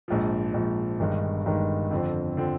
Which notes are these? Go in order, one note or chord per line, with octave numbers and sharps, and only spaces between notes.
A#1 G#2 F3
A#1 G#2 F3
G1 G2 D#3 G#3 D#4
G1 G2 D#3 G#3 D#4
F2 D3 F3 C4
D3 F3 C4